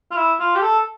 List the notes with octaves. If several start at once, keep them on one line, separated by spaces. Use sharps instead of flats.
F4
E4
F4
G4
A4